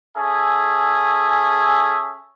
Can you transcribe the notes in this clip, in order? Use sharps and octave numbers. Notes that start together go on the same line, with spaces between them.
C#4 G#4 A4 E5 G#5